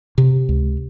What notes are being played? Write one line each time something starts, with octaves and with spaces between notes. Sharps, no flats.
C3
C#2